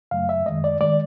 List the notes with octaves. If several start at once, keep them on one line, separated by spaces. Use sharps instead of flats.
F#2 C#3 F#3 A3 F5
E5
F#2 D#3 G#3 D#5
D5
D#3 G#3 D5